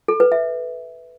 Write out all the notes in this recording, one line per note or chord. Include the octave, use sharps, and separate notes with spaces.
A4
B4
E5